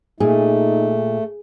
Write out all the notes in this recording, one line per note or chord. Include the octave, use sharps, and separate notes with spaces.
A#2 A3 D#4 G#4